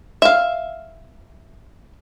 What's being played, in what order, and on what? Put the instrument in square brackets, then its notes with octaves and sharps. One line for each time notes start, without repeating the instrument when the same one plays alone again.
[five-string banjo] E5 F5